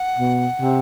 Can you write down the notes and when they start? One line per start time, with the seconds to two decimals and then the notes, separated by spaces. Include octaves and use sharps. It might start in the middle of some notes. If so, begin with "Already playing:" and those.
Already playing: F#5
0.17 B2
0.60 C3